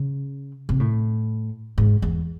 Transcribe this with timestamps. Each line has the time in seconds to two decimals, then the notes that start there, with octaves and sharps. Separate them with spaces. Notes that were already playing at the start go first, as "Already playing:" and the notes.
Already playing: C#3
0.69 C3
0.80 A2
1.78 G#2
2.02 E2